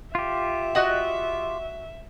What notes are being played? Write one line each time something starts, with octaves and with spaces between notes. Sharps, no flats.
F4 G4 E5
F#4 D#5 F#5